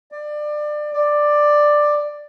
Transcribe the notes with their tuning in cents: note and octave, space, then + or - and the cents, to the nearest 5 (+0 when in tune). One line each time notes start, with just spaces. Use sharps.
D5 +25
D5 +10